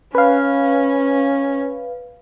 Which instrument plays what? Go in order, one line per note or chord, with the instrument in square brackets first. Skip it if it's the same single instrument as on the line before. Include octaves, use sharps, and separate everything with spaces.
[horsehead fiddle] C#4 [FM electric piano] B4 F5